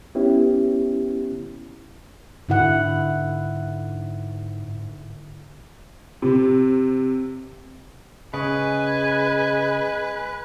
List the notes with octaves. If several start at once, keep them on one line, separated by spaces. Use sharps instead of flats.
B3 C#4 E4 G4
G#2 D3 E4 F#5
C3
C#3 G#3 B4 G#5